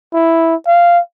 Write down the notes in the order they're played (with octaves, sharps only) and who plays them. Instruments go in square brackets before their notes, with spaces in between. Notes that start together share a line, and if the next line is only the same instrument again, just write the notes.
[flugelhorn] E4
F5